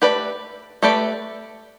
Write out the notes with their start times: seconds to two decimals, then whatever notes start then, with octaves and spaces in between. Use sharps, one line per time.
0.02 A3 G4 B4 D5
0.83 A3 G4 B4 D5